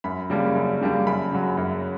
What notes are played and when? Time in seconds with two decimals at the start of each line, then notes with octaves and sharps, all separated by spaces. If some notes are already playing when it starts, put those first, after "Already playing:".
0.04 F#2 B5
0.30 C#3 G3 A#3 D4
0.55 F#2
0.81 C#3 G3 A#3 D4
1.07 F#2 B5
1.32 C#3 F#3
1.57 F#2